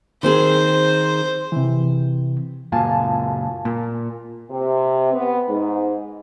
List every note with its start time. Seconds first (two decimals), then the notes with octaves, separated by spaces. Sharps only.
0.23 D#3 C4 G#4 C5
1.52 C3 E3
2.72 F#1 A#2 F5 G#5 A5
3.65 A#2
4.50 C3
5.13 B3
5.48 G#2